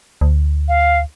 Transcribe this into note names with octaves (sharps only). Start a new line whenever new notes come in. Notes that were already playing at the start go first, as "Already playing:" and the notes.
D2
F5